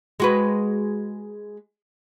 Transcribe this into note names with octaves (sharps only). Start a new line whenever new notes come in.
G#3 F#4 B4